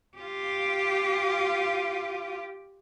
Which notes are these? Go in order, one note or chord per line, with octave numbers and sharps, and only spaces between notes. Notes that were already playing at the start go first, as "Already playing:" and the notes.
F4 G4